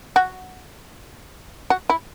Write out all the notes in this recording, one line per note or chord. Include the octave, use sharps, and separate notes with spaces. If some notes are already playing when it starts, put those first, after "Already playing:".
F#4
F#4
E4